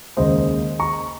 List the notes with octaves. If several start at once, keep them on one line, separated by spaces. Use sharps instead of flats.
D#2 C#3 G#3 C5 D#5
A#5 C#6